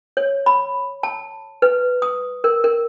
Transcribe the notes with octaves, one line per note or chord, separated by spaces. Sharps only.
C#5
B5
A5
B4
D#6
A#4
A#4